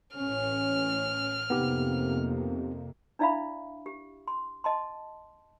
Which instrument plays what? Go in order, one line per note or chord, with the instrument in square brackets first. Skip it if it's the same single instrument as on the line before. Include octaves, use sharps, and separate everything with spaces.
[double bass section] A1 C#4 [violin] F6
[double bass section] F2 C3 A#3 [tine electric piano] B3 D#4 G4
[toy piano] D4 E4 D5 E5 F5 B5
G4
C6
D#5 A5 C6